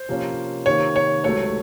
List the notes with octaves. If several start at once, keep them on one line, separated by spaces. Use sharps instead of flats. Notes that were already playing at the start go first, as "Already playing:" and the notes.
Already playing: C5
C3 F3 A#3 C#4
C3 D#3 A#3 C#5
C#5
C#2 C3 F#3 A3 C#5